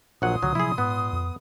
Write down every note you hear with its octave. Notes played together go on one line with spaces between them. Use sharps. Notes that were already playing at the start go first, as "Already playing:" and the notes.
A#1 A#2 F#3 F#5 C6 D#6
C#2 D3 F#3
C3 F3 F#3 E4 G#4
G#2 B3
F2